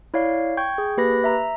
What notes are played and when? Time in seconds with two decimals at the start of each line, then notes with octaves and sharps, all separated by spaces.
0.14 E4 C#5 D5 F5
0.57 G5 C#6 G6 G#6
0.78 G#4
0.97 A#3 G4 B4 B5 A#6
1.24 E5 A#5